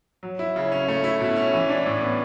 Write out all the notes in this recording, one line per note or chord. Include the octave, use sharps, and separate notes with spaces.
F#3
E4
C#3
C#4
A3
E4
B2
C#4
E3
D4
A2
B3